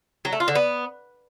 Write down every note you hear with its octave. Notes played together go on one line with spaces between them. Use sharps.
F#3
A3
F4
D3
B3